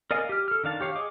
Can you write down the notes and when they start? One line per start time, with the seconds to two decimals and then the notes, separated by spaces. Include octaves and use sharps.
0.11 A#4 D5 D#5 F5 G#5
0.29 G4 F6
0.48 A4 F6
0.64 D#3 D4 F5 A5
0.81 G4 C#5 F5
0.96 G#4 D#5 D6